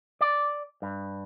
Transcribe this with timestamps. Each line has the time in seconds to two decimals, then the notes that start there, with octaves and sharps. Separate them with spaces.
0.21 D5
0.82 G2